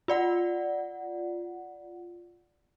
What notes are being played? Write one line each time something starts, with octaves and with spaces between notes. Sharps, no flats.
F4 D5 F#5